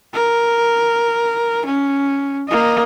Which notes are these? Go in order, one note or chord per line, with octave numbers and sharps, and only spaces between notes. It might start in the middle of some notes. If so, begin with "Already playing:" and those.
A#4
C#4
A#3 D#5